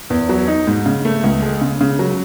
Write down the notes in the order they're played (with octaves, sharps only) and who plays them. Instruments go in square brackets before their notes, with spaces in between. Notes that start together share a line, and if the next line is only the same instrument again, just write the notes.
[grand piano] E2
F#3
D#4
G#2
C#3
A3
C#2
G#3
C#3
C#3
F#3